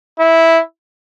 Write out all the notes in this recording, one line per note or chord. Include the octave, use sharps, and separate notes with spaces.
E4